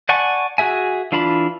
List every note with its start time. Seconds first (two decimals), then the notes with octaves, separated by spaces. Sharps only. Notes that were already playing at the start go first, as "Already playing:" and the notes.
0.09 D5 F#5 G#5 A5 C#6
0.58 F#4 G#4 E5 G#5
1.12 E3 D4 F4 A5 B5